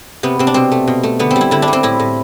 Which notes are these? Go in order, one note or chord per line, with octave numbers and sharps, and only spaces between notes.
C3 B3
C3 C4
D4
B2 C4
A3
B2
A3
D3 B3
C4
G3
E4
D3 E4
D4
G3
C4
A2 E4
A2